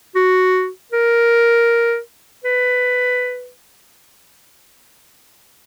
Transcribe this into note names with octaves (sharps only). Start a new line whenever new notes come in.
F#4
A#4
B4